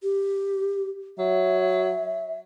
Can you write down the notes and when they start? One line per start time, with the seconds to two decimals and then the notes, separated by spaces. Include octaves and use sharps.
0.03 G4
1.18 F#3 E5